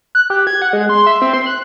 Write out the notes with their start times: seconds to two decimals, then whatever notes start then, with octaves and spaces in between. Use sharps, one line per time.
0.15 F#6
0.30 G4
0.47 G#6
0.62 F#5
0.73 G#3
0.89 C6
1.06 E5
1.22 C4
1.34 C6
1.46 F#6